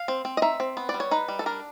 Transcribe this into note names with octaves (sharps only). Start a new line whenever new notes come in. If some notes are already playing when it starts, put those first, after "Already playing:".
Already playing: F5
C4
C4
D#5
D#4 E5
C4
B3
D5
G3
C#5
D#4 B4
G3
A4
D4 A#4